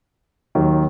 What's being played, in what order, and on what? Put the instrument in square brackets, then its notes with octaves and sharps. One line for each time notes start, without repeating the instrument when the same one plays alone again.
[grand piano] D#2 D#3 F#3